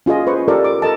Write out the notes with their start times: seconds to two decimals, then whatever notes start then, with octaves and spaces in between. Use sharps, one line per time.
0.06 C#4 F4 G#4 D#5
0.27 B4 C5 C#6
0.48 F4 G4 A4 A#4 D5
0.64 D6
0.82 A4 A#4 D#5 A5